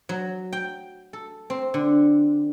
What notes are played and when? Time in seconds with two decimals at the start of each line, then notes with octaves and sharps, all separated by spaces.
0.09 F#3
0.53 G5
1.13 A4
1.50 C4
1.74 D3